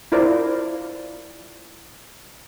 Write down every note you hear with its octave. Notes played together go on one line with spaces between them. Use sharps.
E4 F4 A#4 C5 D5